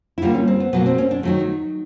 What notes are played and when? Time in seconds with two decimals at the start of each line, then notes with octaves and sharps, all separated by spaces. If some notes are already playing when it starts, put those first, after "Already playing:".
0.18 E4
0.22 D3 G3 A#3 F4
0.35 C#4
0.48 C4
0.60 B3
0.73 B2 F#3 A#3 B3
0.86 C4
0.98 C#4
1.11 D4
1.23 D#3 F#3 A3 D#4